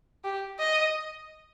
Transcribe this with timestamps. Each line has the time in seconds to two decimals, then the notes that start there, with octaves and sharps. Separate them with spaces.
0.24 G4
0.59 D#5